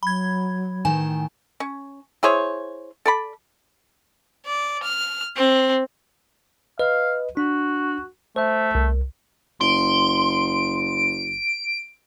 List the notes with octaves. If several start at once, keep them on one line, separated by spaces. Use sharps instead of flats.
F#3 B5 G#6
A2 D#3 G#5
C#4
E4 G#4 C5 C#5
A4 D5 B5
D5
F6
C4
B4 D#5 F5
D4 F#4
A3 C5 E5
C2
F#1 C6 D7